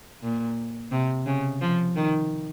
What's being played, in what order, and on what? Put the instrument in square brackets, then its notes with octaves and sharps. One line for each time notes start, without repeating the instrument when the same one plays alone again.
[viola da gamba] A#2
C3
C#3
F3
D#3